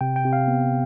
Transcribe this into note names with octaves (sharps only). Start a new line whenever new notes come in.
C3 G5
G5
C3
F5
B3